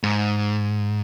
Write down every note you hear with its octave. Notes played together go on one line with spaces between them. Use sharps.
G#2